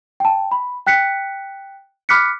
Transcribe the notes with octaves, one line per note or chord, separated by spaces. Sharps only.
G5 A5
B5
G5 F#6 B6 C#7
B5 D6 F6 F#6 B6 C#7